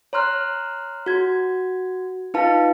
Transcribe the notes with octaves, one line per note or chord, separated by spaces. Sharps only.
C#5 A#5 C6 F6 F#6
F#4 G#6
D#4 F4 B4 F5 A5